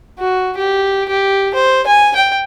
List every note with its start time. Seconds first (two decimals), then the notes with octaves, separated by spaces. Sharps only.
0.19 F#4
0.57 G4
1.09 G4
1.55 C5
1.87 G#5
2.16 G5